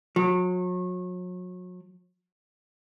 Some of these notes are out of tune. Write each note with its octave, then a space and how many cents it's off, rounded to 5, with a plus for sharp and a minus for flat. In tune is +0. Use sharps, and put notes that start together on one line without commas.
F#3 -35